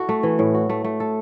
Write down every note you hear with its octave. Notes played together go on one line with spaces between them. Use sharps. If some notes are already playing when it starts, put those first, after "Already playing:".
Already playing: E4 F#4 A4
A3
E3
A2
F#4
A3
A3
A4